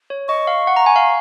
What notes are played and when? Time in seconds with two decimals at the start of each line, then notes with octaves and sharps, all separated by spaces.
0.10 C#5
0.28 D#5 C#6
0.47 F5
0.67 F#5
0.76 A#5
0.86 G#5
0.96 F5